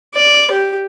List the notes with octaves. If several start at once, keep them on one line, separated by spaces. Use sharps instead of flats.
D5
G4